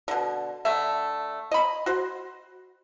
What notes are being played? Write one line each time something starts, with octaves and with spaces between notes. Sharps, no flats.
B2 D3
D3 A3 E5
D#5 B5
F#4 C5